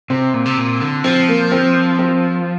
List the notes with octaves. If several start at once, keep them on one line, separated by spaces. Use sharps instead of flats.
C3 C4
A#2
C3
A#2
D3
F3 C4
A#3
C4
C4